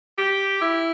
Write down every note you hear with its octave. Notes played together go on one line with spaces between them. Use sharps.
G4
E4